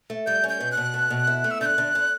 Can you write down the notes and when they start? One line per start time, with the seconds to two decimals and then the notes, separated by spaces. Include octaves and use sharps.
0.10 A3
0.26 G3 G6
0.44 C#4
0.49 G6
0.60 B2
0.72 F#6
0.77 B2
0.94 A3
1.10 B2
1.27 E4
1.44 A3
1.51 E6
1.61 D3 G6
1.66 F#6
1.78 D3
1.95 D3